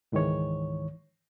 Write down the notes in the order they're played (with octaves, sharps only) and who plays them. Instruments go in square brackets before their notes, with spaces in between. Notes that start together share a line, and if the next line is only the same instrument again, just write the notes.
[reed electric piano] C#2 G#2 D#3 E3 C#5